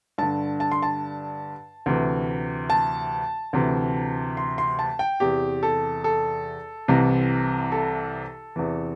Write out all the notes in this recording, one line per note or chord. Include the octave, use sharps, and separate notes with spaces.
G2 D3 A5
A5
C6
A5
D2 C3 E3
A5
D2 C3 E3
C6
C6
A5
G5
E2 C3 E3 G4
A4
A4
C2 C3 E3
A4
E2 C3 E3